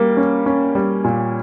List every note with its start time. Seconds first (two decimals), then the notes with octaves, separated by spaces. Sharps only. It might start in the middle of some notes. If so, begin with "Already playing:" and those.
Already playing: G3 A#3
0.17 C#4
0.46 C#4
0.75 G3
1.04 A#2